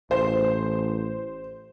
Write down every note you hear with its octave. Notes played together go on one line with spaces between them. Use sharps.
A1 C5